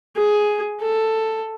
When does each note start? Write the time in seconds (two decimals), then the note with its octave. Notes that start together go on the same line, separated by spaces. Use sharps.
0.17 G#4
0.81 A4